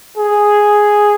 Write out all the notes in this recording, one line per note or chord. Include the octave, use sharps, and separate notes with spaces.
G#4